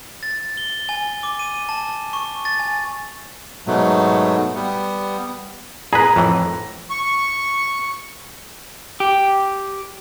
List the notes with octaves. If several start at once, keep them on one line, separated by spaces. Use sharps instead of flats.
A6
G7
G#5
D6
D#7
A5
C#6
A6
G#5
G#2 B2 F#3 A3
G3 B3
G#4 B4 A#5
F2 A2 E3
C#6
G4